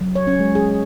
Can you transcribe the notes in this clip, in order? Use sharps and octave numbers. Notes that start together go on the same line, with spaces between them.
F#3
C#5
C#4
G#3
G#4